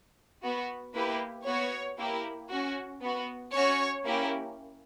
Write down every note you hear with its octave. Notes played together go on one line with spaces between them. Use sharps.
B3 F#4
A#3 E4 G4 B4
B3 F#4 C#5
A#3 E4 G4
C#4 F#4
B3 F#4
C#4 F#4 C#5
A#3 C#4 E4 G4